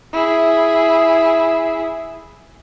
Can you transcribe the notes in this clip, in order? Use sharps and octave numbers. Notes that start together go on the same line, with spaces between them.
E4 G#4